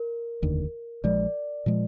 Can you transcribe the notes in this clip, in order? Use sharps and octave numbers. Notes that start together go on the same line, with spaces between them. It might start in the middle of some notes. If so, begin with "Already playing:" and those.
Already playing: A#4
F1 D#2 D3
A#1 A#2 F3 G#3 D5
A#2 F3 G#3